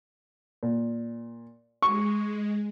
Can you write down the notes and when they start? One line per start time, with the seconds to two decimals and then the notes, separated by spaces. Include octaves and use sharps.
0.63 A#2
1.82 G#3 C#6